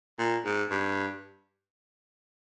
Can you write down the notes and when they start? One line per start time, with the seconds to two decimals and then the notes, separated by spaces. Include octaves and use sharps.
0.19 A#2
0.45 G#2
0.71 G2